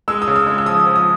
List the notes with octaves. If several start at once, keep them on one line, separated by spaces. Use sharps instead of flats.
G#3 E6
D#6
C#3
E6
G#3
E6
F3 D#6
F3
D#6